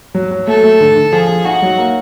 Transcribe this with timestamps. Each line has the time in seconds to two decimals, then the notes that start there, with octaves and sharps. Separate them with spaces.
0.15 F#3
0.31 F#3
0.47 A3 A4
0.64 A3
0.81 D3
0.96 D3
1.12 F3 G#4
1.29 F3
1.45 D#4 F#4
1.62 F#3
1.78 A#3